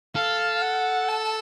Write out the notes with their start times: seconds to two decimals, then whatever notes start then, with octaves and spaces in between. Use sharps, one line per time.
0.15 A4 F5
0.62 F#5
1.08 A5